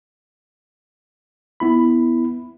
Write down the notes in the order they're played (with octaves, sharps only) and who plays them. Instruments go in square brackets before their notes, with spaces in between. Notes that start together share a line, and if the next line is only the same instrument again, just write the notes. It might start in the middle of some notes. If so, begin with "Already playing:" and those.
[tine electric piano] B3 E4 B5